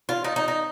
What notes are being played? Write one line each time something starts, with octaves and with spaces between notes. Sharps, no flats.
F4
D#4
D#4
D#4